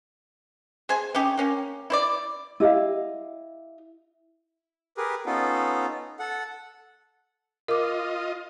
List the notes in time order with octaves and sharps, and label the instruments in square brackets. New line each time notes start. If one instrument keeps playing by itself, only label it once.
[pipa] G#4 C5 G#5
C#4 D#4 G4
A#3 C#4 G4
E4 C5 D5
[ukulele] E4 G4 D#5 F5
[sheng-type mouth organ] G4 G#4 A#4 B4
B3 C#4 D#4 F4 A4
A4 F#5
[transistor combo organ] F4 D#5 [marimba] A#4 D6